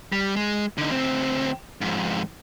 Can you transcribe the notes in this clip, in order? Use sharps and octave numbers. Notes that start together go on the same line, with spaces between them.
G3
G#3
D3 D#4
D2 C4
F2 G#2